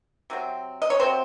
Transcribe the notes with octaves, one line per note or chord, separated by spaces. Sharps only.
C3 F#3 C4
D#5
C#5
C3 F#3 C4 C5